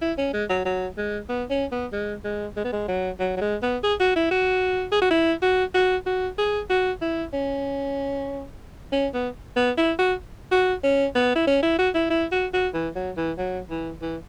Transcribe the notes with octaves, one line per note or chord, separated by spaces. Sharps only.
E4
C#4
G#3
F#3
F#3
G#3
B3
C#4
B3
G#3
G#3
G#3
B3
G#3
F#3
F#3
F#3
G#3
B3
G#4
F#4
E4
F#4
G#4
F#4
E4
F#4
F#4
F#4
G#4
F#4
E4
C#4
C#4
B3
B3
E4
F#4
F#4
C#4
B3
E4
C#4
E4
F#4
E4
E4
F#4
F#4
E3
F#3
E3
F#3
E3
E3